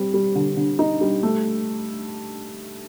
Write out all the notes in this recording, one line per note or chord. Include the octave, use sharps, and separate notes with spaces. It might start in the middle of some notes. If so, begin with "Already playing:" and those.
Already playing: G3 C4
G3
D3
D3
D#4
G3
A3